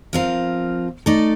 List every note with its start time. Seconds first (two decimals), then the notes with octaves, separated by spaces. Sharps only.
0.13 F3 C4 F4 A#4 F5
1.06 A3 D#4 A4 D5